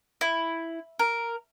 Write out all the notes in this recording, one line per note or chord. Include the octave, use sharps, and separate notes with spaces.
E4
A#4